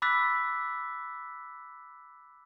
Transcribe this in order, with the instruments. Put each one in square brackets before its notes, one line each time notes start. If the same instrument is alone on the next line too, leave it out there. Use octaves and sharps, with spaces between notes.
[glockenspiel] B5 D6 E6 F#6 A6 B6